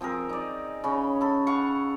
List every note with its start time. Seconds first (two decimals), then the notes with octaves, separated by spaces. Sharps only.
0.01 F3 C4 G#4 A#4
0.29 D#4 D5
0.84 C#3 C#4 B5
1.21 A4 B5
1.47 F5 F#5 C#6